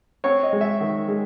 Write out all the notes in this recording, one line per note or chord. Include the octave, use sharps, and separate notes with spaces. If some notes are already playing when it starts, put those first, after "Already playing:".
C4 C#5
D#5
G#3
E5
D#3
G#3